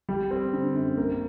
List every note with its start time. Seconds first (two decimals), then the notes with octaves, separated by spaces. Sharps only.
0.09 G3
0.31 C4
0.53 D3
0.75 F#2
0.97 A#3